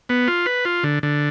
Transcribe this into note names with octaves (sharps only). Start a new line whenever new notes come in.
B3
F4
B4
F4
D3
D3